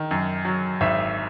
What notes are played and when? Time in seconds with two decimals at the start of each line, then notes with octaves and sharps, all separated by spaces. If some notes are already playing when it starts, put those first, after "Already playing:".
Already playing: D#3
0.11 F#2
0.45 F#3
0.81 G#1 E5